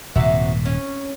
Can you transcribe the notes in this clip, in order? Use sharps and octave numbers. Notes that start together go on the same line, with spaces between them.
D#1 G#2 C3 F#4 E5
C#4